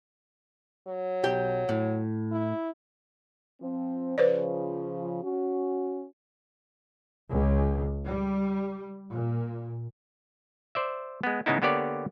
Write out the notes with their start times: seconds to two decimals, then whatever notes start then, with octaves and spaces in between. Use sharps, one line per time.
0.87 F#3
1.23 B1 G4 G5
1.69 A2
2.32 E4
3.61 F3 C4
4.18 C#3 F3 B4 C5 D5
5.23 C#4 F#4
7.31 C#2
8.06 G3
9.13 A#2
10.75 C5 D5 E5
11.23 G#3 B3
11.46 G#2 C#3 G#3 B3 D#4 E4
11.62 D3 A#3 B3 G4 C#5 D5